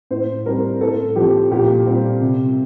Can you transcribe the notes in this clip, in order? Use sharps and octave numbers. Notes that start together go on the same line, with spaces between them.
A2 C5
G3 C4 A#4
A2 A4
F3 C4 G4
A#2 G4
G3 C4 F4
C3